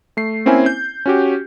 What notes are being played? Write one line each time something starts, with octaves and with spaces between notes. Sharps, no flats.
A3 C7
A#3 C4 C#4 E4 C5 G#5
G6
C#4 F#4 G4